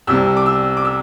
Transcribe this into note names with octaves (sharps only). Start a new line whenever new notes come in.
C2 C3 G3 E6
D6
E6
D6
E6